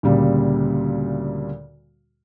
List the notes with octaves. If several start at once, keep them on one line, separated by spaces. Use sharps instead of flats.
D2 A#2 C#3 G3 A#3